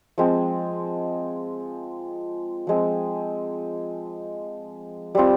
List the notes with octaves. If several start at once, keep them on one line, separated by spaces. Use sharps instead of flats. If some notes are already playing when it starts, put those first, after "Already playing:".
F3 G#3 C4
F3 G#3 C4
G3 C4 F4